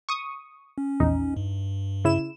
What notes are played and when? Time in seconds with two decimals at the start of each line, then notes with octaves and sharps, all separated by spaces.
0.09 C#6 D#6
0.78 C#4
1.00 A#1 E2 D#4
1.37 G2
2.05 C#3 E4 E7